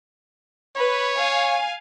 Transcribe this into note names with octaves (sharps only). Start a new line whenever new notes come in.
B4 C#5
F5 G#5